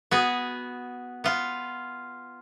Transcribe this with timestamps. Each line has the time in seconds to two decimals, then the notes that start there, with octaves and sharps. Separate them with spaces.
0.11 B3 F#4 G#4
1.24 B3 F4